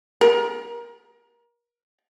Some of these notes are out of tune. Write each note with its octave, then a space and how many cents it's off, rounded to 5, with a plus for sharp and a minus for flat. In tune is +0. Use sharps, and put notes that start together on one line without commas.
A#4 +30